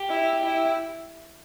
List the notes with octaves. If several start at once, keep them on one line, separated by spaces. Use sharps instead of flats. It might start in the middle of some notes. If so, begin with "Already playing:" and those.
Already playing: G4
E4
E4